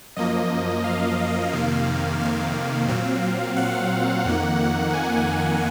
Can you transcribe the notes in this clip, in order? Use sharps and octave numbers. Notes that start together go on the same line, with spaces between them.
F#2 F3 A#3 D#5
F5
F2 C3 D#3 A#3
F5
A#2 F#3 C4
F#5
F2 D#3 A#3
G#5
F#5